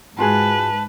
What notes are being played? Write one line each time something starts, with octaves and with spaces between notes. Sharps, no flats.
G#2 F4 F#4 G#4 B4 A5